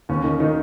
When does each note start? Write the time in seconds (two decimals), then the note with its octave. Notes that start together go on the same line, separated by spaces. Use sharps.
0.09 D#2 C#4
0.24 D#3
0.40 D#3 D#4